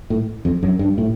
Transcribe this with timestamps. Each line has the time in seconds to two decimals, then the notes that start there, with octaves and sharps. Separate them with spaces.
0.10 A2
0.45 F2
0.63 F#2
0.79 G2
0.98 A2